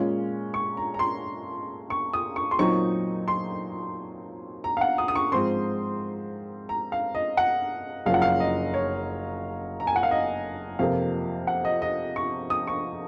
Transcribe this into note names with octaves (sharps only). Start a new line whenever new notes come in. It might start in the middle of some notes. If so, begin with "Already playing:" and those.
Already playing: A#2 G#3 C#4 F4
C#6
A#5
A#5
C6
C#6
D#6
C#6
C6
A#2 F#3 C4 D#4 C#6
C6
A#5
F5
F#5
D#6
D#6
C#6
G#2 F3 C4 C6
A#5
F5
D#5
F#5
F#1 F#2 F3 F5
F#5
F5
D#5
C#5
A#5
G#5
F#5
F5
D#5
F2 C3 F3 A#3 F5
F#5
D#5
D#5
C#6
D#6
C#6